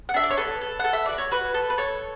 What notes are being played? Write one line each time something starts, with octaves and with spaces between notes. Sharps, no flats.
F#5
D4 E5
D5
C#5
A4 B4
A4
A4 F#5
E5
F#4 D5
C#5
F#4 B4
A4
B4
A4 C#5